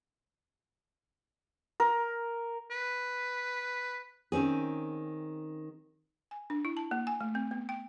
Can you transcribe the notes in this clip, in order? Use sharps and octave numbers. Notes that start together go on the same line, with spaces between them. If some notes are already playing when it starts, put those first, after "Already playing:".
A#4
B4
D#3 C4 C#4 G#4
G#5
D4
E4
A5
A#3
G#5
A3
C4
B3
G5